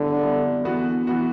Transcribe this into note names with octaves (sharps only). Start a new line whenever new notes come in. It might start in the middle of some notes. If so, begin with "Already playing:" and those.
Already playing: D3 G3 B3 E4
G3 B3 E4
E3 B3 F#4
E3 B3 F#4